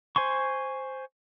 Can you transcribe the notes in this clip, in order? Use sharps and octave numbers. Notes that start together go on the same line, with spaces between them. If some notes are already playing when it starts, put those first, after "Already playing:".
C5 G#5 C6 C#6